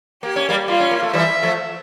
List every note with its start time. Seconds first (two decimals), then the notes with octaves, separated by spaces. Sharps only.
0.23 A#3 G4
0.36 C#4
0.49 G3 A#3
0.68 G3 A#3 F4
0.80 C#4
0.91 A#3
1.03 A3
1.13 E3 G3 E5
1.43 F3 A3